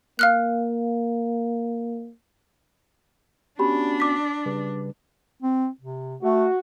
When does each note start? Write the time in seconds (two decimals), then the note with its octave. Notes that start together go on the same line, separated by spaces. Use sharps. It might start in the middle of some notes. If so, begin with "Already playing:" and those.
0.19 A#3 F5 F6 F#6
3.59 B3 C#4 D4 F#4 G4 B5
4.00 D6 B6
4.46 C#3 G3 B4
5.42 C4
5.81 C3
6.22 A3 F#4